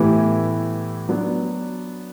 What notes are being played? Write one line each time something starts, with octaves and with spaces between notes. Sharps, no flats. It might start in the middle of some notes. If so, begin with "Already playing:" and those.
Already playing: A2 E3 B3 E4 G4
F#3 B3 D4